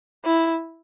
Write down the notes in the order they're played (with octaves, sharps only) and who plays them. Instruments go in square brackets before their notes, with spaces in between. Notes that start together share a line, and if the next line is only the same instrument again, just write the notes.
[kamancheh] E4